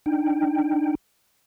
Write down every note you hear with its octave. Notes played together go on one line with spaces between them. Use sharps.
D4 D#4 G5